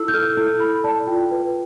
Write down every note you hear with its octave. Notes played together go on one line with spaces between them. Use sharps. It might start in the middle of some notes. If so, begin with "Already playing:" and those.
Already playing: E4 A4 E6
G6
A4 F6
E4 G6
A4 B5
D5 A5
F4 G5
B4